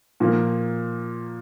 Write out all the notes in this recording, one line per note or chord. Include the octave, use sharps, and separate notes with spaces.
A#2 F3 A#3